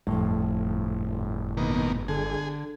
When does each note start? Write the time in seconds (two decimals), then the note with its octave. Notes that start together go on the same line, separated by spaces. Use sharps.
0.07 G1 F2 A2
1.57 B2 D#3 A#3
2.08 D3 G#4